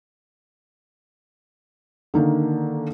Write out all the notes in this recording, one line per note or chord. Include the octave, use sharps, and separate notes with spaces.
D3 D#3 A#3